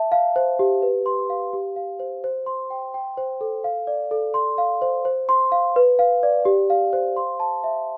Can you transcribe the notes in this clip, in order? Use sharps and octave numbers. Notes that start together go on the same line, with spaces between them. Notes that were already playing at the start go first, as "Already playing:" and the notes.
Already playing: E5 A5
F5
C5
G4
B4
C6
F5
G4
F5
C5
C5
C6
G5
G5
C5
A4
F5
D5
A4
C6
F5
C5
C5
C6
F5
B4
F5
D5
G4
F5
C5
C6
A5
E5